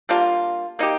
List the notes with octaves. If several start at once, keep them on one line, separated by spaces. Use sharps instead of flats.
G3 A#3 D4 F4
A#3 D#4 G4